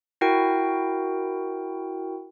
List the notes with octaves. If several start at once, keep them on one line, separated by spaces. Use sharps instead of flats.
E4 F#4 A#4 G5